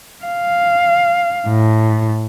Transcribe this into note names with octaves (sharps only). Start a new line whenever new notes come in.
F5
A2